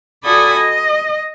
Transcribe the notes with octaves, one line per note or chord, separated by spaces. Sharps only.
F#4 A4 D5 G#5 B5 D#6
D#5